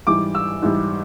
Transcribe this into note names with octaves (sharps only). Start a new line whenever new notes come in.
G#2 E3 G3 D6
E6
G#2 E3 G3